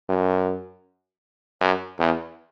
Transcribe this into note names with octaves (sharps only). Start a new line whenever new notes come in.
F#2
F#2
E2